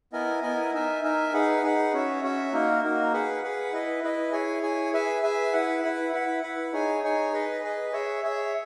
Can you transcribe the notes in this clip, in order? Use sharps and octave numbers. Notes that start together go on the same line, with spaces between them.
B3 E4 A#4 D#5 G#5
B3 E4 A#4 D#5 G#5
D#4 A#4 E5 G#5
D#4 A#4 E5 G#5
D#4 G#4 B4 F#5
D#4 G#4 B4 F#5
C#4 F#4 C#5 E5
C#4 F#4 C#5 E5
A#3 D#4 F#4 A#4
A#3 D#4 F#4 A#4
G#4 B4 F#5
G#4 B4 F#5
E4 B4 D#5
E4 B4 D#5
E4 G#4 C#5 G#5
E4 G#4 C#5 G#5
G#4 B4 E5 G#5
G#4 B4 E5 G#5
E4 B4 F#5
E4 B4 F#5
E4 B4 F#5
E4 B4 F#5
D#4 G#4 C#5 G#5
D#4 G#4 C#5 G#5
G#4 B4 D#5
G#4 B4 D#5
G#4 C#5 E5
G#4 C#5 E5